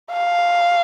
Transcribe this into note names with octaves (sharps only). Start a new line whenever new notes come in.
F5